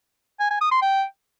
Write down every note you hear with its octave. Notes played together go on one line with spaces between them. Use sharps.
G#5
G#5
D#6
C6
G5